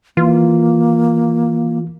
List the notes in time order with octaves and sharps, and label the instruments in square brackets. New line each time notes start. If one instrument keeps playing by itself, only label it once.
[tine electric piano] E3 [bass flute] A#3 [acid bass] F4